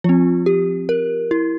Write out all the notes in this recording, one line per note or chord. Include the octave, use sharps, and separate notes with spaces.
F3 C4 F4
G4
A#4
E4